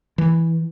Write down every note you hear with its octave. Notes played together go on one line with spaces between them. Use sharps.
E3